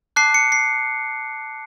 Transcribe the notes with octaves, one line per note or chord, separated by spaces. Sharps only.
A5 D6 F#6 C7
C#7
C7